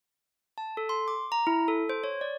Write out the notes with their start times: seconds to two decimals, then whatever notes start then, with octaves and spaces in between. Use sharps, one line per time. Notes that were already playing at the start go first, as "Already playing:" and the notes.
0.58 A5
0.77 A4
0.89 C6
1.08 D6
1.32 A#5
1.47 E4
1.68 A4
1.89 C5
2.04 C#5
2.21 D5